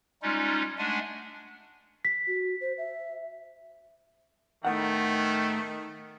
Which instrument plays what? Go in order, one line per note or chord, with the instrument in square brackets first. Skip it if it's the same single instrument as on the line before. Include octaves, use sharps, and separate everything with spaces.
[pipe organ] G3 G#3 C#4 D#4 F4
G#3 A3 D4 F#5 G#5
[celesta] B6
[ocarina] F#4
C5
E5
[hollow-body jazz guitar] A2 B3 F#5 [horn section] D#3 [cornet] A3